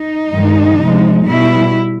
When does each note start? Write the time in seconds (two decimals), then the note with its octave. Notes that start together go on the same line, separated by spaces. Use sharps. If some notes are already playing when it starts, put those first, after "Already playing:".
Already playing: D#4
0.32 G2 D#3 G#3
0.80 C3 F3 G#3
1.26 B2 G3 E4